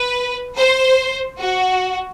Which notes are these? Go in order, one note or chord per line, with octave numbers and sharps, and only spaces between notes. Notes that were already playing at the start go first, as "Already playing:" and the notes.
Already playing: B4
C5
F#4